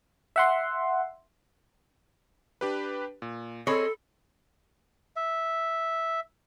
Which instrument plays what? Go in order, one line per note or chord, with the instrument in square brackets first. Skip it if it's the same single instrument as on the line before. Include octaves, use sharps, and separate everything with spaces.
[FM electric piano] E5 F#5 C6
[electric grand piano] D4 G4 B4
A#2
[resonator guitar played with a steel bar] C4 G#4 C#5 [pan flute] A4 [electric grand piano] D#5 B5
[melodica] E5